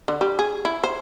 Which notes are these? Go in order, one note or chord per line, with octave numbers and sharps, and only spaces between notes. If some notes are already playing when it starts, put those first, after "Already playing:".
D3
G3
G#4
E4
C5